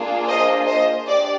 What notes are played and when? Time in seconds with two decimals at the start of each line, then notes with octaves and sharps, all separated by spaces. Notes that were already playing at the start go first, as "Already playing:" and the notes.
Already playing: A#3 D4 F4 G#4
0.28 C5 D#5
0.66 C5 D#5
1.04 D4 G4 D5